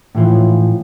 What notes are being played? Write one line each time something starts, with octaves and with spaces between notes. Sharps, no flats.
A2 E3 F3